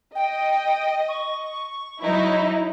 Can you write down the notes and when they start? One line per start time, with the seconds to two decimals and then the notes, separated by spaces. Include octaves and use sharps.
0.15 D#5 G5
1.09 C#6
2.00 F#3 D#4 E4